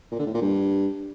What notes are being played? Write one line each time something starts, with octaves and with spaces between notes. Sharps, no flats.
A#2
D3
A2
A#2
G2